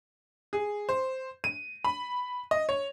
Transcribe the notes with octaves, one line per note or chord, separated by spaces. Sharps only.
G#4
C5
D#7
B5
D#5
C#5